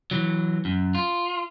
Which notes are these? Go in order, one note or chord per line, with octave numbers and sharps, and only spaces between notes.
E3 F#3
F#2
F4